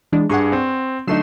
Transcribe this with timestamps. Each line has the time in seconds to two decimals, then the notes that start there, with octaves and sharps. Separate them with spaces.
0.13 E3 G#3 D4
0.30 G2 G#4 F#5 G#5 C#6
0.52 C4
1.07 D3 F#3 A3 D#4 C7 E7